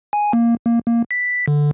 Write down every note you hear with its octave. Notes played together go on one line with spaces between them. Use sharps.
G#5
A#3
A#3
A#3
B6
D3